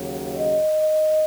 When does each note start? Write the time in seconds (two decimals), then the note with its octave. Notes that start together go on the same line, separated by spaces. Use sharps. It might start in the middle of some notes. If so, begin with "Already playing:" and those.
Already playing: D#2 C#3 F#3
0.39 D#5